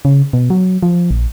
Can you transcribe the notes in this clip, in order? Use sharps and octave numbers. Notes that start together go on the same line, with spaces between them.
C#3
B2
F#3
F3
A#1